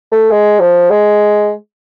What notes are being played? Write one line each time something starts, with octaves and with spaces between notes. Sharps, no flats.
A3
G#3
F3
G#3